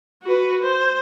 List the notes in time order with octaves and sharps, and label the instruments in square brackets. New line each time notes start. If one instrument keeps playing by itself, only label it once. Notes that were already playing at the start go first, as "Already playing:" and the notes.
[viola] F#4 B4
C5